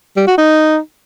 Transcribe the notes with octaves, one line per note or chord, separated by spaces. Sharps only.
G3
F#4
D#4